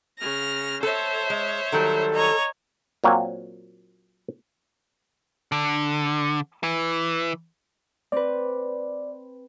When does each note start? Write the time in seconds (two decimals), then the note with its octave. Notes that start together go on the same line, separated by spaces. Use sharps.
0.19 C#3 F6 A#6
0.83 A4 C5 C#5 E5
1.30 G#3
1.72 D#3 F#3 G3 A4
2.13 C#5 D#5 A#5
3.04 A#2 F#3 A#3 C4 F5 G#5
5.52 D3
6.63 E3
8.12 C4 B4 D5